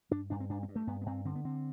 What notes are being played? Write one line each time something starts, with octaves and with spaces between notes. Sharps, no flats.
G2 D4
G2 D4
C4
G2 D4
C4
G2
A3
G2 B3
B3
G2 C4
D3 C4
B3
D3 C4